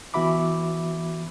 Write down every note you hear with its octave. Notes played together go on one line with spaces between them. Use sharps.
E3 B3 F#4 E5 B5 D6